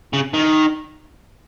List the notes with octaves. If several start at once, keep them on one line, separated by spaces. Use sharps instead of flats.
C#3
D#3